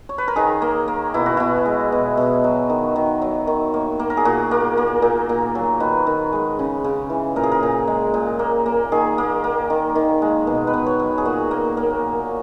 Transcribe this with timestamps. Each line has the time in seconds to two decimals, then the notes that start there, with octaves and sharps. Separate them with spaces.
0.09 C#5
0.18 B4
0.28 A#4
0.36 D#3 G#4
0.62 A#3
0.88 A#3
1.14 B2 E4
1.26 F#4
1.37 B2 E4
1.66 G#3
1.92 B2
2.17 B2
2.44 F#3
2.70 D#3
2.96 D#3
3.22 F#3
3.47 D#3
3.74 A#3
3.99 A#3
4.10 A#4
4.17 G#4
4.25 A#2 F#4
4.51 A#3
4.77 A#3
5.02 A#2
5.29 A#2
5.55 F#3
5.80 D#3 B4
6.07 D#3
6.33 G#3
6.59 C#3
6.84 C#3
7.10 E3
7.36 A#2 A#4
7.43 G#4
7.52 A#4
7.63 A#2
7.87 G#3
8.14 A#2
8.39 A#3
8.66 A#3
8.92 D#3 G#4
9.18 A#3
9.44 A#3
9.70 D#3
9.95 D#3
10.22 G#3
10.47 B2
10.67 B4
10.73 B2
10.87 C#5
10.99 F#3
11.18 G#4
11.25 A#2 F#4
11.51 A#3
11.77 A#3